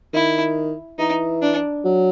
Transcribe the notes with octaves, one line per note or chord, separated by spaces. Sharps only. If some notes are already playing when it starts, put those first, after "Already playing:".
D#3 E4
E3 D#4
D4
F#3